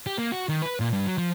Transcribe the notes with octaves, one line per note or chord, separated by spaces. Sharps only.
G4
A#3
F#4
D#3
B4
A#2
G2
F#3
F3